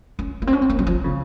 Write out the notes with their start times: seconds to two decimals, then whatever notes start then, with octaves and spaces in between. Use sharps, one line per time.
0.19 C#4
0.42 A#3
0.47 C4
0.53 C#4
0.62 C4
0.70 A#3
0.79 F#3
0.87 F3
1.04 C#3